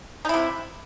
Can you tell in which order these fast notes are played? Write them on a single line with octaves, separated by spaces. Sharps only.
D#4 E4 C3